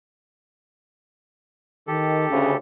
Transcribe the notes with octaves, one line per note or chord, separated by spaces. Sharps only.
D#3 G4 A4
D2 C#3